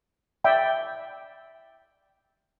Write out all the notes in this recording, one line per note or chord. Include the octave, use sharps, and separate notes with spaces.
D5 E5 G5 B5